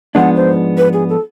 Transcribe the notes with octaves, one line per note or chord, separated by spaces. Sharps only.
G#2 F3 G#3 B3 D4 F#5
C5
B4
G#4
A4